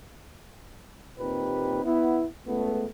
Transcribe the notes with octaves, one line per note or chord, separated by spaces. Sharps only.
D#2 A#2 C4 D#4 G4 B4
B3 E4
C#2 A3 B3